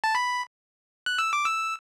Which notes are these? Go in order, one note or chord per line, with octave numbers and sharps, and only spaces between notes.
A5
B5
F#6
E6
D6
E6